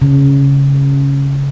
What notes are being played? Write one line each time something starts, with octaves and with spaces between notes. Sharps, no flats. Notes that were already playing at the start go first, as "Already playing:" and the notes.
C#3